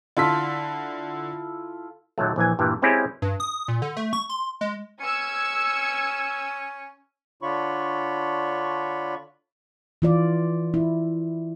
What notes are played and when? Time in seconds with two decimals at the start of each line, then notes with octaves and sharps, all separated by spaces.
0.17 D3 E4 F4 A4 B6
2.18 D#2 A#2 F#3 A3
2.36 A#1 E3 G#5
2.59 G2 A#2 E3 G4
2.82 G#3 C4 C#4 E4 G4 G#4
3.22 G2
3.40 D#6
3.68 A#2
3.82 D3
3.97 A3
4.13 C#6
4.29 C6
4.61 G#3
5.00 C#4 E6 G#6 C#7
7.42 D3 D4 F4 C#5 B5 C#6
10.02 E3 F4 D5
10.74 E4